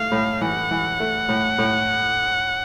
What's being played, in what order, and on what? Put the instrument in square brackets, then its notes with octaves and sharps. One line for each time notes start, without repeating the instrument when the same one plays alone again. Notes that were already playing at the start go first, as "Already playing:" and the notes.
Already playing: [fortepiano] A3 [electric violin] F5
[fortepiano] A2
[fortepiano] E3 [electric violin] F#5
[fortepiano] E3
A3
A2
A2